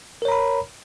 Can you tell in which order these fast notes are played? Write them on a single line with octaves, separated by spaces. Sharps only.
A#4 C#5 A#5 B5